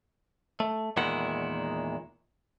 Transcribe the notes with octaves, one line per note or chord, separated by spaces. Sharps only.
A3
E2 A#2 D#3 G#3 E4 F#5